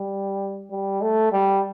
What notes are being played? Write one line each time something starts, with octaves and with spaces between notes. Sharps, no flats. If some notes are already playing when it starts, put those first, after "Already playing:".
Already playing: G3
G3
A3
G3